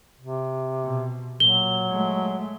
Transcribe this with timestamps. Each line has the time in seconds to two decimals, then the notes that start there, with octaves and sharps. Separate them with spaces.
0.21 C3
0.84 B2
1.40 A#2 F#3 G7
1.91 G#3 A3